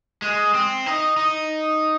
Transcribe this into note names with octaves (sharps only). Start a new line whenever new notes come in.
G#3
C4
D#4
D#4